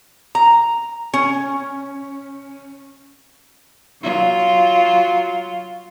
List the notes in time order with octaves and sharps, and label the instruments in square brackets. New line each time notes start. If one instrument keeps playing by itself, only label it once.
[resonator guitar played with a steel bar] A#5
C#4
[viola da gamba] F#3 F4